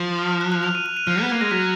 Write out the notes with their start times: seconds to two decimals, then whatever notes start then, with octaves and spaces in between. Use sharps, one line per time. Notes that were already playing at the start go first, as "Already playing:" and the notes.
Already playing: F3
0.19 F6
0.31 F6
0.41 F#6
0.52 F#6
0.63 F7
0.75 D#7
0.86 F7
0.97 D#7
1.07 F3 F6
1.18 B3 F#6
1.30 A#3 G#6
1.41 G#3 A#6
1.51 F#3 B6